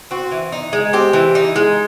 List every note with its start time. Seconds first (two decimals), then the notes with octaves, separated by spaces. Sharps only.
0.11 C4 F#4
0.31 E3
0.52 D#4
0.73 G#3
0.93 C4 G4
1.13 E3
1.35 D#4
1.56 G#3